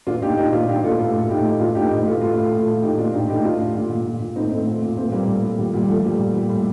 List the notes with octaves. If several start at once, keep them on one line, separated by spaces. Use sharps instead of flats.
A#2 D4 F4
A#2 D#4 G4
A#2 D#4 G4
A#2 D4 F4
A#2 D#4 G4
A#2 F4 A4
A2 F4 A4
A2
A2 D#4 G4
A2
A#2 D4 F4
A#2 D#4 G4
A2 D#4 G4
A2 F4 A4
A2 F4 A4
A2
A#2
A#2
A#2 D#4 G4
A#2 D4 F4
A2 D#4 G4
A2 D#4 G4
A2 D4 F4
A2
A#2
A#2
A#2
A#2
A2 C4 D#4
A2 A3 C4
A#2
A#2
A#2 A3 C4
A#2 G3 A#3
A2
A2
A#2 G3
A#2 G3
A#2 F3 A3
A#2 G3 A#3
A#2
A#2 G3
A2